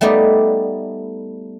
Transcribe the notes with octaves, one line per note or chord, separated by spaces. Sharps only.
G3 A3 B3 D#4 D5